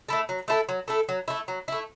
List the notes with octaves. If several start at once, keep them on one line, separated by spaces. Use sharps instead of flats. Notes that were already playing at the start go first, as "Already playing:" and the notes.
A3 E4 A4
F#3
A3 E4 A4
F#3
A3 E4 A4
F#3
A3 E4
F#3
A3 E4